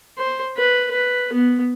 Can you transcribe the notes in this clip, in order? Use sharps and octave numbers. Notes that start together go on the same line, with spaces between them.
C5
B4
B4
B3